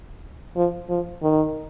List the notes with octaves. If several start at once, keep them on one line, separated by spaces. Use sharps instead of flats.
F3
F3
D#3